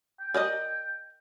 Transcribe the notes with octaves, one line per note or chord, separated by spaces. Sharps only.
G5
A#4 D5 D#5